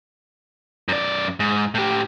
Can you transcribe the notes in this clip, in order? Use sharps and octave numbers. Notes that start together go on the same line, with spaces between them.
F#2 D5
G#2
A2 G4